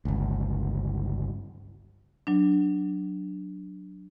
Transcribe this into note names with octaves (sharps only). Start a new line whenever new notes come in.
G1 C#2
F#3 D4